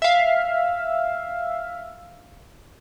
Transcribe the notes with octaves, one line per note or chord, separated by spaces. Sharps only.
E5 F5